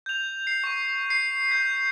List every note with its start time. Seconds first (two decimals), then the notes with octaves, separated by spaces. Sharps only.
0.06 G6 F7
0.47 C7
0.64 C#6 D#7
1.10 C7
1.49 G6 B6